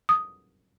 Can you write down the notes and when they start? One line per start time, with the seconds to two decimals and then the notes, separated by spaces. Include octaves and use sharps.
0.09 D#6